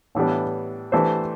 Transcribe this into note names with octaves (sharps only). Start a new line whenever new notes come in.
A2 E3 G3 B3 D4
E3 A3 D4 G4 C5